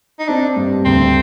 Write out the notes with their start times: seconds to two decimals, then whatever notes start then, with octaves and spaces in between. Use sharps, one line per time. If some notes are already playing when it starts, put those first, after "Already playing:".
0.19 D#4
0.28 C4 D4
0.56 G2
0.85 D2 C4